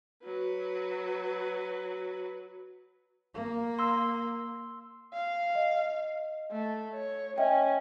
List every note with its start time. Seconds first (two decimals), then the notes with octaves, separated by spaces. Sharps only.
0.24 F#3 B4
3.34 A#3
3.79 C6 E6
5.14 F5
5.55 D#5
6.51 A3
6.95 C#5
7.38 C#4 D#5 E5 G5